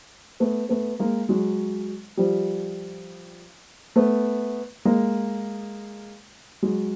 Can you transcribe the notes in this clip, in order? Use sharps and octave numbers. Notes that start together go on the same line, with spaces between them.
A3 B3
A3 B3
G#3 A#3
F#3 G#3
F3 G3
A3 B3
G#3 A#3
F#3 G#3